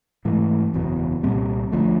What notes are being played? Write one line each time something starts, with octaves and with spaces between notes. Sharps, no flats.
G#2 E3 A3
F#1 E2 B2
C2 A#2 G3 C4
D2 D3 F3 A3